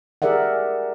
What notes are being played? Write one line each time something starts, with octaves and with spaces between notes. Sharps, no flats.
G4 G#4 A#4 D5 E5 F#5